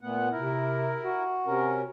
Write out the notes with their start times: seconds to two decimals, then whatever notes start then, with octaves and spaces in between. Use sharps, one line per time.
0.01 A#2 A3 B3 F#5
0.32 C3 E4 A#4
1.02 F#4
1.47 C3 C#4 A#4